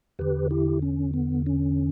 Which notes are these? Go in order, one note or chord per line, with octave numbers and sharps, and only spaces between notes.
E2 D3 G4 B4
E4 G4
C#4
B3
C#4